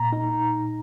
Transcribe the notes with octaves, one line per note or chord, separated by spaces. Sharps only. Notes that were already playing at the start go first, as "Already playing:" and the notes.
Already playing: A#2 A#5
D#4